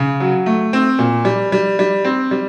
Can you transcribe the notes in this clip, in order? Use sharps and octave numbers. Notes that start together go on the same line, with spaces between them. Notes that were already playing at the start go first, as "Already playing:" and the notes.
Already playing: C#3
F#3
A3
C4
A#2
G3
G3
G3
C4
G3